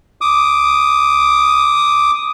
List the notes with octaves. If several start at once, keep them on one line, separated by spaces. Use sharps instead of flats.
D6 D#6